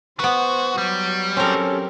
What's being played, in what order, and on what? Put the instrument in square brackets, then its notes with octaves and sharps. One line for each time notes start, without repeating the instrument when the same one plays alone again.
[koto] B3 B4 [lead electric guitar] F#4 [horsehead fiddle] C5
[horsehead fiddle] F#3 [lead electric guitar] G3
[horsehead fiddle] F#3 G4 [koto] C4 A#4 [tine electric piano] C#4 A4